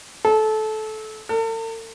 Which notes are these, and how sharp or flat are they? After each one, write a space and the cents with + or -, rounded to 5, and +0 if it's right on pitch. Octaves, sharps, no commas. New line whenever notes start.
A4 -20
A4 +45